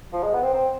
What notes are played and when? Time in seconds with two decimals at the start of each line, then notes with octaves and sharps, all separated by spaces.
0.13 F3
0.23 G#3
0.33 B3
0.42 C4
0.54 C4